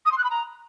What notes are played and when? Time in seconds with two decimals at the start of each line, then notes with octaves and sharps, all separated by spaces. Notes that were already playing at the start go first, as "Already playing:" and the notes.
0.05 D#6
0.11 C6
0.18 F#6
0.24 B5
0.30 A#5